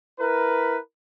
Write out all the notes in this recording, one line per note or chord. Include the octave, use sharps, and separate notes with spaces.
E4 A#4 B4